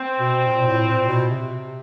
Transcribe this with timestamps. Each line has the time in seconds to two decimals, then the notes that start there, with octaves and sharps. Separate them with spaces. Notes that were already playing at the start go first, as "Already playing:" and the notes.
Already playing: C4
0.20 B2
0.47 A#2
0.62 A#2
0.67 A2
0.88 A#2
1.08 B2
1.29 C3